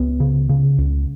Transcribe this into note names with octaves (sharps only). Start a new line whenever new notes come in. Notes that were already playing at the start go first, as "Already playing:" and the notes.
Already playing: C#2 B3
C#3
C#3
C#2